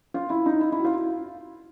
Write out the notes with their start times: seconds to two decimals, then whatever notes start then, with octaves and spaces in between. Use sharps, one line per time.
0.14 F4
0.30 E4
0.46 D#4
0.61 E4
0.72 E4
0.79 F#4
0.85 F4